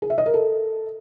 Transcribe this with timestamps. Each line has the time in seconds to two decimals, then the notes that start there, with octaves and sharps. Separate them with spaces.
0.02 G#4
0.10 E5
0.18 D#5
0.26 A#4
0.34 A4